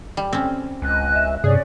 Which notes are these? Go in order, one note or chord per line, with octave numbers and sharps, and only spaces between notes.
G3
C4 C#4
C#2 D#5 G#5 F#6
E5
G2 C3 C#4 G#4 D5